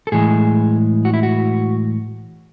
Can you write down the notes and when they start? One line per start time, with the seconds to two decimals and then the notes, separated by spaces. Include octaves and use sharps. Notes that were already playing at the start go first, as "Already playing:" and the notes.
0.07 A4
0.12 A2 E3 G#3 G#4
1.05 F#4
1.14 E4
1.23 F#4